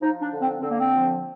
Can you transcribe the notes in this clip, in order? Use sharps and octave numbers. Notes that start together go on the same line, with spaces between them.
F3 D#4
D4
D3
C4
D3 C4
A#3
C4
F3